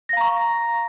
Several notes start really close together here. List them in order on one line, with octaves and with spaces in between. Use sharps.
A#6 F5 A#5 C#6